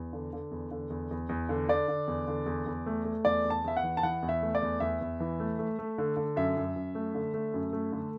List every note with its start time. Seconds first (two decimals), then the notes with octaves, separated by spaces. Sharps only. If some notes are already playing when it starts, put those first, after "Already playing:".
Already playing: E2
0.13 D3
0.33 D3
0.51 E2
0.71 D3
0.90 E2
1.11 E2
1.29 E2
1.49 D3
1.69 D3 D5
1.88 D3
2.08 E2
2.28 D3
2.46 E2
2.66 E2
2.86 A3
3.05 A3
3.25 E2 D5
3.44 E2
3.50 A5
3.64 E2 E5
3.77 F#5
3.83 E3
3.97 A5
4.03 E3 F#5
4.23 E2
4.29 E5
4.42 A3
4.55 D5
4.62 E2
4.80 E2 E5
5.01 E2
5.20 E3
5.40 A3
5.59 A3
5.79 A3
5.98 D3
6.17 D3
6.36 F#2 E5
6.57 F#2
6.76 F#2
6.95 A3
7.15 D3
7.34 A3
7.54 F#2
7.73 A3
7.92 D3